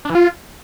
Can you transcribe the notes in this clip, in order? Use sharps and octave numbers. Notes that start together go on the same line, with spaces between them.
D4
E3
F4